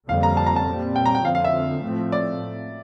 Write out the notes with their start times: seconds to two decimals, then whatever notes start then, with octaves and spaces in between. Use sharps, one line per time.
0.08 F2 D3 G3 A#3 F5
0.23 A#5
0.37 A5
0.46 A#5
0.56 A5
0.67 A#2 G3 C4
0.96 G5
1.06 A#5
1.15 G5
1.25 F2 D3 F3 C4 F5
1.35 F5
1.44 E5
1.83 A2 F3 A3 C4
2.12 D5